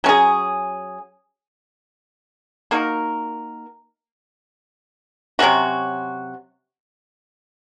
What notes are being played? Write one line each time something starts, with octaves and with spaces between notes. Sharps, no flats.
F#3 C#4 G#4
A#3 D#4 F#4 A#4
C3 F#3 C#4 F#4